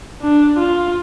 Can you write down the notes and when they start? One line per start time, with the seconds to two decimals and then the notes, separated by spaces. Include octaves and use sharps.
0.22 D4
0.58 F4